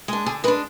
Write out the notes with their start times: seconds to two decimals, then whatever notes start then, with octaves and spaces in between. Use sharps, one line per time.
0.08 G#3 D4
0.26 D3 G#4
0.44 G#3 B4
0.48 D4